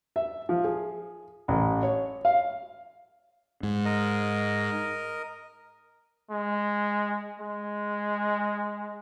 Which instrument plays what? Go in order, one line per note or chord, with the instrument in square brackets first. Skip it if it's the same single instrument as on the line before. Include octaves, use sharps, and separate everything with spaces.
[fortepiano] E5
F3
G#4
A1
C#5
F5
[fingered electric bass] G#2
[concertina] A#4 D#5
[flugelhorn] G#3
G#3